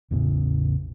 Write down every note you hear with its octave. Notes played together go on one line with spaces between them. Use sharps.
A1 E2 A2 C#3